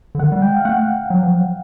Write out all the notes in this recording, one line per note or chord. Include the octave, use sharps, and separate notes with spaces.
D3
D#3 F#5
G3
G#3 G5
F5
A3 F#5
F#3
F3
F#3